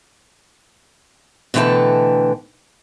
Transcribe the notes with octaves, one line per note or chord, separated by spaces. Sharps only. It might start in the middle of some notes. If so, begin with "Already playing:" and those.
B2 D3 E3 A3 G5 A5